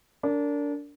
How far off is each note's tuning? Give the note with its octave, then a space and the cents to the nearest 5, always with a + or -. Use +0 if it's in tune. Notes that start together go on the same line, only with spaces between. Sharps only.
D4 -25 A#4 -25